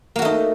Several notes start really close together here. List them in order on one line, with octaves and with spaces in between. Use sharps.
A#3 F#4 A3 D#4